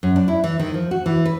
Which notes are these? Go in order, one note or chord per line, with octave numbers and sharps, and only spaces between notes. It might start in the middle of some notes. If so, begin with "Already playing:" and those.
F#2
D4
E4
E3
D#3
F3
F#4
E3
B4